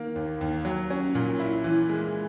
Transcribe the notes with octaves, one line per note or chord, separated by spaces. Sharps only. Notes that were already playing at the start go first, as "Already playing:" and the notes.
Already playing: D#3 A#3
D#2
D#2
F#3
C#4
A#2
E4
E3
G#3